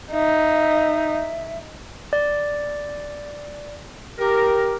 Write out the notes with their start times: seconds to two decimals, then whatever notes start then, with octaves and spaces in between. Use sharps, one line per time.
0.12 D#4 E5
2.13 D5
4.19 G4 A#4